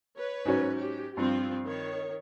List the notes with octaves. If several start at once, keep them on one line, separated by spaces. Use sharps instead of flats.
B4 C#5
G#2 F#3 C#4
G4
G2 F3 C4 F4
D#3 C#5